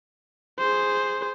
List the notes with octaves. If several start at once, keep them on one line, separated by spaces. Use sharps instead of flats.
G#4 C5